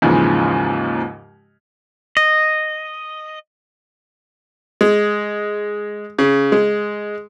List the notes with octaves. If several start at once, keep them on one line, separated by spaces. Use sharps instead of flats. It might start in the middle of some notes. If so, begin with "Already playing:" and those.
D#2 G#2 C#3 E3 F3 G#3
D#5
G#3
C#3
G#3